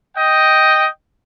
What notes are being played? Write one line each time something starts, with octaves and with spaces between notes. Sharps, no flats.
D#5 G5